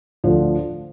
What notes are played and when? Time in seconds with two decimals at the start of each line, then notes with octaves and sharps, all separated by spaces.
0.24 D2 D3 F3